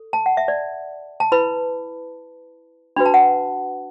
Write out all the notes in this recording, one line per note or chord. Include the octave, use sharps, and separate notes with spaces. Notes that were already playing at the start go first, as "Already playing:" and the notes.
Already playing: A4
A5
F#5
E5
D5
A5
E4 B4 B5
D4 F#4 B4 B5
A5
F#5